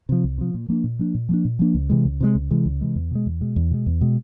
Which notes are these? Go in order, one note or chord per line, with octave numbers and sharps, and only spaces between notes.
C3 F3
C2
C3 F3
A#2
F3 A#3 D4
A#2
F3 A#3 D4
A#2
F3 A#3 D4
A#2
F3 A#3 D4
C#2
C3 E3 G#3
C#2
C3 E3 G#3
C#2
C3 E3 G#3
C#2
C3 E3 G#3
E2
B2 G#3
E2
B2 G#3
E2
B2 G#3
E2
B2 G#3